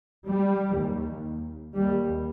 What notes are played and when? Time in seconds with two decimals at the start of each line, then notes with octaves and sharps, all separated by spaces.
0.27 G3
0.77 D#2
1.75 D#2 G3